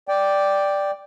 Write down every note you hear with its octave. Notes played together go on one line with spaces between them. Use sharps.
D5 G5